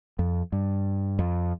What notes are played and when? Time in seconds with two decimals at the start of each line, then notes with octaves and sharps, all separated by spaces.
0.19 F2
0.52 G2
1.19 F2